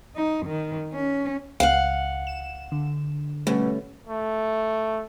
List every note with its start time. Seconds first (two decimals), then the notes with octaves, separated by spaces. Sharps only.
0.16 D#4
0.46 D#3
0.93 C#4
1.60 C#2 F5 F#5
2.27 E7
2.72 D3
3.47 B2 G3 A3 C#4
4.07 A3